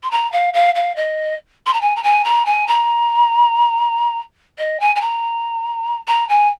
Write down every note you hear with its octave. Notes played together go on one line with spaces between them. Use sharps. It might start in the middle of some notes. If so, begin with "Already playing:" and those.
C6
A#5
F5
F5
F5
D#5
C6
A#5
G#5
A#5
G#5
A#5
G#5
A#5
D#5
G#5
G#5
A#5
A#5
G#5